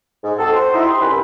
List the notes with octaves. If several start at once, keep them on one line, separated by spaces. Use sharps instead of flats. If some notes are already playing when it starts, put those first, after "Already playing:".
G#2
C4 F#4 A4
F#4 C5
D#4 E4
G4 C6
C2 F#2 C#4 B4 B5